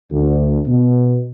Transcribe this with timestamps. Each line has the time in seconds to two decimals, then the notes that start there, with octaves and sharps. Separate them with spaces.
0.11 D2
0.66 B2